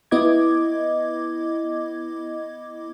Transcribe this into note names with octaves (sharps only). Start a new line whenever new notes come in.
B3 E4 D#5 D6 G#6